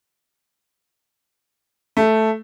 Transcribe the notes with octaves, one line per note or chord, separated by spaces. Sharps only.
A3